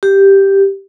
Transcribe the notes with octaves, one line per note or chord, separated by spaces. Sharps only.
G4